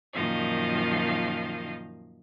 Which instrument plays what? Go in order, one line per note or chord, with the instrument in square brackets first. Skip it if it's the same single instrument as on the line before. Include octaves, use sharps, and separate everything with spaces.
[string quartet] F#2 A#2 D#3 F3 D#5 F5